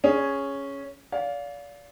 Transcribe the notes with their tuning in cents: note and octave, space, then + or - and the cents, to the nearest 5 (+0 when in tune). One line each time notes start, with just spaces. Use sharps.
C#4 +0 G#4 +0
D5 -35 F5 +10